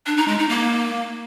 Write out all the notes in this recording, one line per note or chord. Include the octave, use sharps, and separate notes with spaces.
D4
D#4
G#3
D#4
A#3